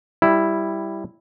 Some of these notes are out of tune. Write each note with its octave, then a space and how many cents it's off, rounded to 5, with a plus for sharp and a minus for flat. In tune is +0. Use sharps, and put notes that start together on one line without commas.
G3 +0 E4 +0